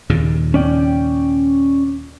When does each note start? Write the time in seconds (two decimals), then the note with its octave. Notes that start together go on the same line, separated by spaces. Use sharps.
0.09 D#2 A#2 C#3
0.54 C#4 D5 G5